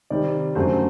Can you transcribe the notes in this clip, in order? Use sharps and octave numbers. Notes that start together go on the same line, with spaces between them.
C3 D#3 G3 D5
F#2 D3 F#3 A3 C5